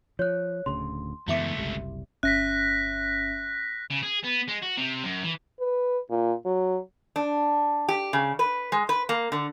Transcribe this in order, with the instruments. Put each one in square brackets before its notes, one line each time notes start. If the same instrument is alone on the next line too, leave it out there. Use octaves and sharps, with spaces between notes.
[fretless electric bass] F3 [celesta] C#5 F#6
[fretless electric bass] D1 D2 C#3 [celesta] C6
[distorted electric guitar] C#2 A3 [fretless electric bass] F#2 E3 B3 [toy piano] E4 E5 D6
[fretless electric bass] F#1 C2 G3
[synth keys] G1 C#4 E5 [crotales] F#6 A#6 B6
[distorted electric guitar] C#3
G#4
B3
G#3
F#4
C3
F#2
E3
[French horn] B4
A#2
F#3
[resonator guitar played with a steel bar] D4
G4
C#3
B4
G#3
B4
A#3
D3